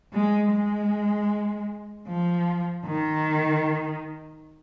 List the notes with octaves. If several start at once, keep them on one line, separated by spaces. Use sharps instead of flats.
G#3
G#3
F3
D#3